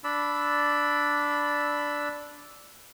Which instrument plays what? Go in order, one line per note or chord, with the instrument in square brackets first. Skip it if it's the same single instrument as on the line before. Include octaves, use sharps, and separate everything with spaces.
[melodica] D4 D5 B5 E6